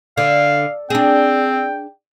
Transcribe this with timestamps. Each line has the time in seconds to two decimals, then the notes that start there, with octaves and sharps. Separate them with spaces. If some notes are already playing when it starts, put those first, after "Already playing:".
0.17 D3 F5
0.90 C4 D4 G#4 G5